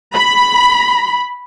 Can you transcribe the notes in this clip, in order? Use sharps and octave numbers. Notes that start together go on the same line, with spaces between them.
B5